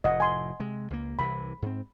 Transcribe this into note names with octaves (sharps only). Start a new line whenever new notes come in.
F1 A2 D#5 F#5
G#5 C6
C3 G#3
C#2 A#3
C2 C3 E3 B5
G#2 C4